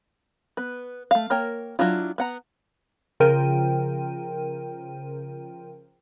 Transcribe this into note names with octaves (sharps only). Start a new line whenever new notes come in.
B3 B4
A3 F5
A#3 A#4 C#5 G5
F#3 D4 E4 F4
B3 F#5 A#5
C#3 F3 F4 A#4 G5 D#7